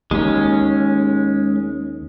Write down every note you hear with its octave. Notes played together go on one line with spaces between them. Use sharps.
D#2 G#3 C#4